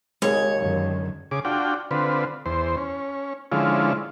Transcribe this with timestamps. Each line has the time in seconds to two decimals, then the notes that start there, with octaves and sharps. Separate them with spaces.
0.22 D#2 G#3 C#5
0.56 F#2 D3 D#3
1.31 C#3 G#4 D6
1.45 D4 F4 F#4 G5
1.91 D3 C4 F4 B4
2.46 E2 C5
2.77 C#4
3.52 D3 F3 G#3 C#4 E4 F4